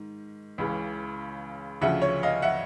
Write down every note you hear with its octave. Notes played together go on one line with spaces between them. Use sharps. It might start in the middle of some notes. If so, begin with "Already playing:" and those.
Already playing: G#2 D#3
C#2 C#3 E3
D2 C#3 F3 E5 F#5
C#5
D#5 F5
E5 F#5